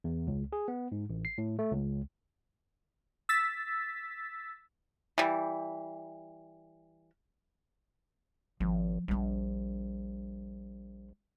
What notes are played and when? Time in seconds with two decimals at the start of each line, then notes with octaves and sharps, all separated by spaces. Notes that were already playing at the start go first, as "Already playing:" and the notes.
0.04 E2
0.27 C#2
0.53 G#4
0.68 B3
0.92 G#2
1.10 A1
1.25 C7
1.38 A2
1.59 A3
1.72 C#2
3.29 E6 A6 B6
5.18 E3 G3
8.60 G#1 F3
9.08 A#1 G3 D4